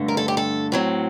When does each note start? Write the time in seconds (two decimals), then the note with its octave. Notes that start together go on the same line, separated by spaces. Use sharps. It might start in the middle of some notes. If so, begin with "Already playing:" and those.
Already playing: G2 D3 A3
0.08 A#4
0.17 A4
0.28 G4
0.37 A4
0.72 A2 F#3 C4